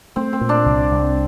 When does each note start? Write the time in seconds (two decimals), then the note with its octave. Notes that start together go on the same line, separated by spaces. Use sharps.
0.16 A3 C4
0.33 C4
0.41 A#2
0.49 D4
0.66 C2
0.92 C2